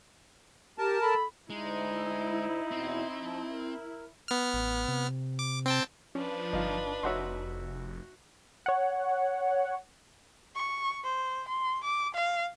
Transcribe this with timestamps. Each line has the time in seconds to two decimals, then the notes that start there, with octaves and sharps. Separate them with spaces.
0.78 G4 A#4 A5
1.02 A4 B5
1.50 D2 G#3 D#4 E4
2.71 E2 B2 C4
3.18 F3
3.50 A#4
4.28 B3 F6
4.54 A1
4.88 C3
5.39 D6
5.66 C4 G5 A5
6.15 F3 C#4 D4 B4
6.53 G1 D#4 F4
7.03 F1 D#4 F#4 C#5 E5 F#5 C6
8.66 C#5 F#5
10.56 C#6
11.04 C5
11.48 C6
11.84 D6
12.15 F5